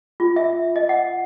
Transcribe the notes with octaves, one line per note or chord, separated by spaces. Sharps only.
F4
E5
D#5
F#5